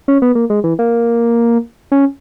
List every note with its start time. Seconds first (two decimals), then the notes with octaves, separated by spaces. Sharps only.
0.08 C#4
0.22 B3
0.35 A#3
0.50 G#3
0.64 E3
0.79 A#3
1.92 C#4